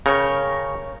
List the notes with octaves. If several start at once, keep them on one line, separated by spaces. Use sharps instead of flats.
C#3 A#4 C#5 G5